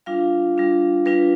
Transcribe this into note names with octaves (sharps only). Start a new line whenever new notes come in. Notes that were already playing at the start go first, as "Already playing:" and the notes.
G3 D4 F4 F5
G3 D4 F4
G3 D4 F4 B4